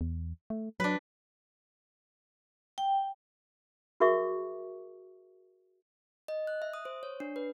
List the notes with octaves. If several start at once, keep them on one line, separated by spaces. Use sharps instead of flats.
E2
A3
F#3 D4 B4
G5
F#4 G#4 A#4 E5 C#6 D6
D#5
F#6
E5
D#6
C5
C#5
D4
B4